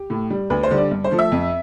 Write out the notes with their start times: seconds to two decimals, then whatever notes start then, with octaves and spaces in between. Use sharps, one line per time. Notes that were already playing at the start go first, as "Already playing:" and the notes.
Already playing: G4
0.10 A2
0.30 G3
0.50 D2 B4
0.63 C5
0.71 D3 G3
0.78 D5
0.91 G2
1.04 C5
1.11 F3 A3
1.19 E5
1.32 F2